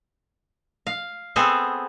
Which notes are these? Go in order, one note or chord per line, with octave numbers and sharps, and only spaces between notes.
F5
B3 C4 G#4 A4